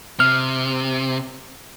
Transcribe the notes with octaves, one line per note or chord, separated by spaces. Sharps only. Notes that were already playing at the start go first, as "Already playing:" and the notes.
C3 F6